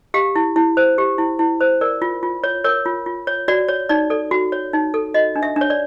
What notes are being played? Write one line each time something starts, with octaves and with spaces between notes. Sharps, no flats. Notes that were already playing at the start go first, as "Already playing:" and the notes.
G4 F5
E4
E4
C5
G4
E4
E4
C5
A#4 D5
F4
F4
C#5
A#4 C#5
F4
F4
C#5
F#4 D5
C#5
D#4 D5
A4 D5
F#4
C#5
D#4
A4
F#4 D#5
D4
E5
D4
C#5
D5